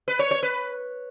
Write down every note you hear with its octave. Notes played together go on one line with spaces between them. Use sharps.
B4
C#5
C#5
B4